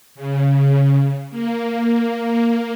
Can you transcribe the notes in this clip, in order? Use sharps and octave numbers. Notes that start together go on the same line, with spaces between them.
C#3
A#3